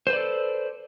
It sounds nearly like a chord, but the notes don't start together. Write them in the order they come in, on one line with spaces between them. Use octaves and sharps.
C5 B4 D5 A4